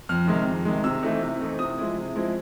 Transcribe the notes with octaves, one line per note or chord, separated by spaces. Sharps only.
F2 F6
C3 D#3 G#3
F2
C3 D#3 G#3
C3 E6
E3 A3 C4 D#4
C3
E3 A3 C4 D#4
C3 D#6
F3 G#3 C4 E4
C3
F3 G#3 C4 E4